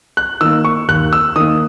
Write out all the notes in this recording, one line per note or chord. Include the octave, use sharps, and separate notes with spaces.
F#6
D#3 A#3 E6
C#6
D#2 F#6
E6
D#3 A#3 D#6